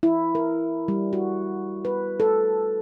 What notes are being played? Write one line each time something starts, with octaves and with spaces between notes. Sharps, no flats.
E4
A#4
G3
F#4
B4
A4